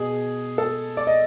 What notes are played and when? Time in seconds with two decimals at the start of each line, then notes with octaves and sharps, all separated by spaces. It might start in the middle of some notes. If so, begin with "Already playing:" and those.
Already playing: B2 G#4
0.58 A4
0.97 D5
1.07 D#5